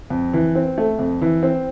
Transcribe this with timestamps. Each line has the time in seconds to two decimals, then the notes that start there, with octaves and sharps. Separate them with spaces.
0.10 F2
0.33 E3
0.55 C4
0.78 A3
0.99 F2
1.21 E3
1.43 C4